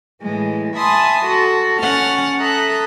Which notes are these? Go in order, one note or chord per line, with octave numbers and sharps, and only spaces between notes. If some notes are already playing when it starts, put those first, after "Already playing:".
A2 E3 G#3
E5 G#5 A5 B5 C6 D#6
F#4 A4
C#4 F#5 C#6 F6 A6
A4 E5 A#5 D#6 F#6